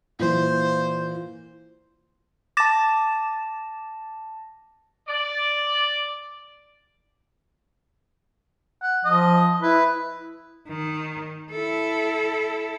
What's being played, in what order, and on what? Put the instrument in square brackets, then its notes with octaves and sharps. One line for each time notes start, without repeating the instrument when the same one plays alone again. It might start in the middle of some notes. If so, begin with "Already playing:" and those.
[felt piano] A#2 E3 [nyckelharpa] C5
[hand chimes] A5 A#6 [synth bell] D6 A6 E7
[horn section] D5
[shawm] F#5
[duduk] F3 [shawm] D#5
[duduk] E4 [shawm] B4
[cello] D#3
E4 A4